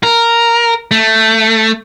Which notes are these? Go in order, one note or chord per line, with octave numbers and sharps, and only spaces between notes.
A#4
A3